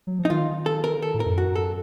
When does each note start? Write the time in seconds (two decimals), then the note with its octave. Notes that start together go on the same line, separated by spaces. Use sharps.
0.07 F#3
0.19 F3
0.25 D#4
0.30 D#3 F4
0.66 A4
0.84 A#4
1.02 A4
1.14 A2
1.20 A#4
1.26 F#2
1.38 F#4
1.56 A4